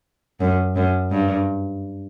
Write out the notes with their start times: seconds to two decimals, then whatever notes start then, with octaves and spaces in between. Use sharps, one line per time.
0.40 F#2
0.76 F#2
1.11 G2